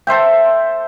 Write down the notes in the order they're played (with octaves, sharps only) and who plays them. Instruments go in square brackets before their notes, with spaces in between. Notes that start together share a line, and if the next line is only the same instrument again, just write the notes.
[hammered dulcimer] A4 C5 E5 G5